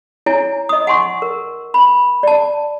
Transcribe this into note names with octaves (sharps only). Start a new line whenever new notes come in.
E4 C#5 G#5 A#5
D#5 D#6
F#5 G#5 C6 C#6
A#4
B5
D5 A5